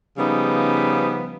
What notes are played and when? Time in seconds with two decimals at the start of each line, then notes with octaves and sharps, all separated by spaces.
0.18 C#3 F3 G3 B3 D#4